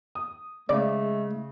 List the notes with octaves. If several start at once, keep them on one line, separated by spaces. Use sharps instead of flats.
D#6
C#3 G#3 A3 D5